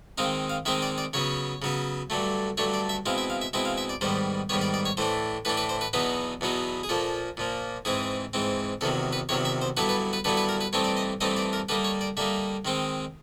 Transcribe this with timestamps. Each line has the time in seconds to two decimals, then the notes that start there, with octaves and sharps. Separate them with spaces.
0.18 D#3 G#3 C4 D#4 F5
0.50 F5
0.66 D#3 G#3 C4 D#4 E5
0.82 D5
0.98 D5
1.13 C#3 F#3 B3 C#5
1.62 C#3 F#3 B3
2.10 G2 D3 F#3 A3
2.57 G2 D3 F#3 A3 C#5
2.74 D5
2.89 E5
3.06 B2 G#3 C4 E4 F5
3.18 E5
3.30 F5
3.41 E5
3.53 B2 G#3 C4 E4 E5
3.65 F5
3.78 E5
3.89 D5
4.01 G#2 D#3 G3 B3 C5
4.49 G#2 D#3 G3 B3 C#5
4.61 D5
4.74 D5
4.85 C#5
4.97 A2 E3 A3 D4 C5
5.45 A2 E3 A3 D4 B4
5.57 B4
5.69 C5
5.81 B4
5.93 E2 B2 F#3 B3 D#4 B4
6.41 E2 B2 F#3 B3 D#4
6.83 G#4
6.89 A#2 F3 A#3 A4
7.37 A#2 F3 A#3
7.85 G#2 E3 G#3 C4 G#4
8.33 G#2 E3 G#3 C4
8.81 E2 C3 D#3 F#3 A4
9.13 B4
9.29 E2 C3 D#3 F#3 C#5
9.45 E5
9.62 C5
9.77 G2 D3 F#3 B3 E4 B4
9.89 B4
10.13 B4
10.24 G2 D3 F#3 B3 E4 B4
10.37 B4
10.49 A#4
10.61 B4
10.73 G2 E3 A3 C4 D#4 C#5
10.84 D5
10.97 D#5
11.21 G2 E3 A3 C4 D#4 D#5
11.37 D5
11.53 A#4
11.69 D3 G3 A#3 D#4 B4
11.84 C#5
12.01 D5
12.17 D3 G3 A#3 D#4 E5
12.65 D#3 G#3 C4 D#4